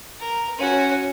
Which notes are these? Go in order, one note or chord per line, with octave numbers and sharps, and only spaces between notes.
A#4
C#4 F#4